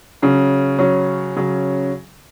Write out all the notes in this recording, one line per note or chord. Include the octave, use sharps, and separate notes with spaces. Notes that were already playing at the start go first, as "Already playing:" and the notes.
C#3 F#3 C#4
C#3 F#3 C#4
C#3 F#3 C#4